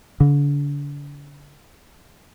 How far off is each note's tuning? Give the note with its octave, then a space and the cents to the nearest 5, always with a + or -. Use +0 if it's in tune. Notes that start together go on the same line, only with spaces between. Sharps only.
D3 -40